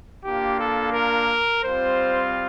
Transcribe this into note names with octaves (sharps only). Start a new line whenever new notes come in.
A#3 D4 F4 G4
A4
A#4
G3 C4 F4 C5